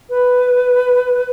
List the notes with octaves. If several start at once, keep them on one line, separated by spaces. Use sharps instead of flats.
B4